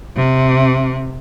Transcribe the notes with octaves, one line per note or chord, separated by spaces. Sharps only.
C3